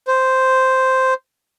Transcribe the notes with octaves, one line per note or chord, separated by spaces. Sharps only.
C5